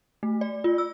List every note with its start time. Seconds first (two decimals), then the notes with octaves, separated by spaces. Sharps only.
0.23 A3
0.41 D5
0.64 F4
0.78 E6